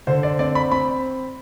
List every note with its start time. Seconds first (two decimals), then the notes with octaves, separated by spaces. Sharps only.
0.07 D3 C5
0.23 D5
0.39 C4 D5
0.55 B5
0.71 C4 B5